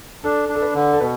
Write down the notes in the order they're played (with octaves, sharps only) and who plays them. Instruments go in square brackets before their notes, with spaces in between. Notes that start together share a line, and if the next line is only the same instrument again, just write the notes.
[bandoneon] D4 [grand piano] A4
[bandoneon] D4
[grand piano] A4
B4
[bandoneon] D3
[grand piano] A4
[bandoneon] B2 [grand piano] B4